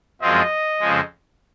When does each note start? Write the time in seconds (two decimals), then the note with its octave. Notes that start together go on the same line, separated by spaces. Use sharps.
0.21 F#2 F3 G#3 C4 F4 D#5
0.80 F2 C#3 F3 G#3